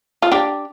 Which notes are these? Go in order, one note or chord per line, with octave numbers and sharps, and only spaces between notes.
F4
D4 G4